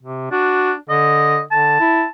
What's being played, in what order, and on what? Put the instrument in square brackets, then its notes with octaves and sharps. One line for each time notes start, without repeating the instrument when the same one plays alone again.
[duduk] C3
[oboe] D4 [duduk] F#4
[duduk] D3 [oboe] D#5
[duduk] D3 [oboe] A5
[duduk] E4